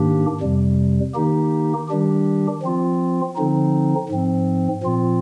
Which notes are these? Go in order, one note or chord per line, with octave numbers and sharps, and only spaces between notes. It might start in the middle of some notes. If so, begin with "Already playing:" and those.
Already playing: G#2 D#3 A#3 D4 G4
F2 C3 G3
D#3 A#3 D#4 G4
D#3 G3 D4 G4
F3 C4 F4
D3 F3 C4 D#4
G#2 F3 C4
A#2 F3 C4 F4